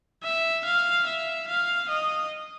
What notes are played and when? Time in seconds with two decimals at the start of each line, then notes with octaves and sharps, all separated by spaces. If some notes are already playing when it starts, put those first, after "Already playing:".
0.24 E5
0.65 F5
1.07 E5
1.48 F5
1.89 D#5